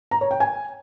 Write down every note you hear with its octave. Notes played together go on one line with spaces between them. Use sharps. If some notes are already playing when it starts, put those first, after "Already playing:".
A#5
C#5
G5
G#5